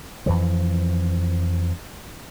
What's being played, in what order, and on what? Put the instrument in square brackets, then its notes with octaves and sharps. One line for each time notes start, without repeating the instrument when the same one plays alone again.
[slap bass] F2 E3 F3